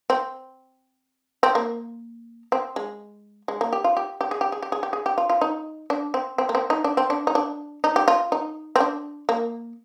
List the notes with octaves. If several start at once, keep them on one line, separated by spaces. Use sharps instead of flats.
C4
C4
A#3
C4
G#3
G#3
A#3
G4
F4
G4
G4
G#4
G4
G#4
G4
G#4
G4
G#4
G4
F4
F4
D#4
D4
C4
C4
A#3
C4
D#4
D4
C4
D4
D#4
D4
D#4
G4
F4
D#4
C4
D4
A#3